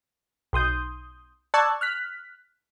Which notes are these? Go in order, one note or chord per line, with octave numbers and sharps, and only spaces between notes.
B1 C6 D#6 G6
D5 A5 C#6 E6 F#6 G#6
F6 F#6 B6